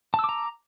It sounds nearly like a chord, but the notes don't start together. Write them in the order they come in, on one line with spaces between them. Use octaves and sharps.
A5 E6 D6 A#5